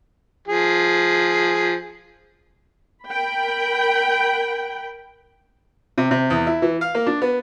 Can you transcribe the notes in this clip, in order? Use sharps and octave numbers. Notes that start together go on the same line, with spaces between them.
F3 G#4
A#4 G5 B5
C3
C3
E2
E4
E3
F5
A#3
D4
B3